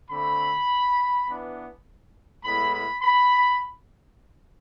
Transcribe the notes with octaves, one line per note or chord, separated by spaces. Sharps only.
D3 A3 C4 B5
E3 B3 D4
A2 G#3 B3 E4 B5
B5
B5